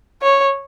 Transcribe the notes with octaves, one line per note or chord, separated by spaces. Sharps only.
C#5